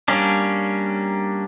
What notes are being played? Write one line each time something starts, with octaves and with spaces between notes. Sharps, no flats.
G3 A#3 C#4 D4